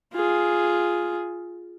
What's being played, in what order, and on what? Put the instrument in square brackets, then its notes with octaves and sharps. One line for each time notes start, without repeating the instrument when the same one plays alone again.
[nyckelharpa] F4 G#4